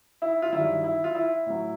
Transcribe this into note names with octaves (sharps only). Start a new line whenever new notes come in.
E4
F4
G2 D#3 F#3 E4
E4
F4
E4
A2 F#3